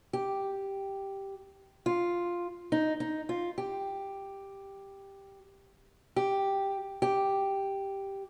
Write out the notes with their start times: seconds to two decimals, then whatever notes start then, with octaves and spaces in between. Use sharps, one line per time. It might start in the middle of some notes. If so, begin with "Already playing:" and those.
0.13 G4
1.86 F4
2.72 D#4
3.00 D#4
3.29 F4
3.58 G4
6.16 G4
7.02 G4